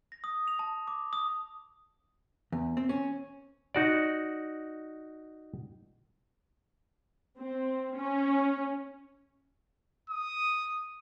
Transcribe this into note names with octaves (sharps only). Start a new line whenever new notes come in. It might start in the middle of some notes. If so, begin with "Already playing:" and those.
A#6
D#6
F7
A5
D6
D#6
E2
C4
C#4
D#4 F#4 D5
C4
C#4
D#6